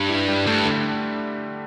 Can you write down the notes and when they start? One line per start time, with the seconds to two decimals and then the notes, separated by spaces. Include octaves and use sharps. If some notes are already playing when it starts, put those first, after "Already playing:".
Already playing: G2
0.09 E4
0.29 G3
0.47 G2 A3
0.65 D3